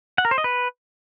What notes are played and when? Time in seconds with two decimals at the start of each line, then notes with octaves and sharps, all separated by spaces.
0.18 F#5
0.25 A#4
0.31 C5
0.38 D#5
0.44 B4